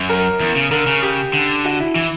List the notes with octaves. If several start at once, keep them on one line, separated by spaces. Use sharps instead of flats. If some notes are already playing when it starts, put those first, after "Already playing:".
Already playing: F#2
A#4
E2
C#3
D3 A#4
C#3
G4
D3
F#4
E4
E3